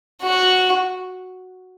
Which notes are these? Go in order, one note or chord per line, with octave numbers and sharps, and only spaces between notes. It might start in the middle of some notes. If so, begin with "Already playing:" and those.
F#4